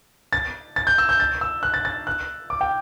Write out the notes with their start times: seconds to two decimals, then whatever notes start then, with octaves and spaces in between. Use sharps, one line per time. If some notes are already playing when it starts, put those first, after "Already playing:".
0.33 A6
0.76 A6
0.87 G6
0.98 E6
1.09 G6
1.20 A6
1.41 E6
1.63 F#6
1.74 A6
1.85 A6
2.07 F#6
2.50 D6
2.61 G5